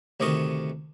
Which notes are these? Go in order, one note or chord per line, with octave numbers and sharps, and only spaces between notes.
D2 C3 D#3 D#5 C#6 D#6